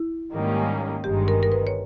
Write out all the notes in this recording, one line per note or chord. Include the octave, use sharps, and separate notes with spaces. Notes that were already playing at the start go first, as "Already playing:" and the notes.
Already playing: E4
G#2 D#3 G3 A#3 C#4
G1 G2 D#3 G#3 G4
A#4
A#4
B4
C#5